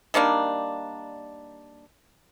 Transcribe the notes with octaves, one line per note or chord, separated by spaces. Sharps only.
D#3 G3 A#3 D4